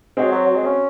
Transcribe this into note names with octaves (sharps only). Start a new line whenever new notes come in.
G#3 C4 F#4 C#5
F#3
F#3
G#3
C#4